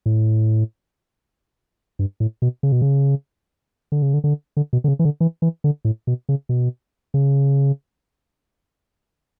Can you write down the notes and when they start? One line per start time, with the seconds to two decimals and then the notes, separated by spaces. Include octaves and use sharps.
0.06 A2
1.99 G2
2.20 A2
2.42 B2
2.63 C#3
2.72 B2
2.82 C#3
3.92 D3
4.02 C#3
4.14 D3
4.24 D3
4.57 D3
4.73 B2
4.84 D3
4.88 C#3
4.99 E3
5.05 D3
5.20 E3
5.42 E3
5.64 D3
5.85 A2
6.07 B2
6.29 C#3
6.49 B2
7.14 C#3